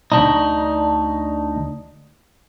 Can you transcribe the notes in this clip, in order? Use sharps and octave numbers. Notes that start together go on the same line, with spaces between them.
D2 D4 D#4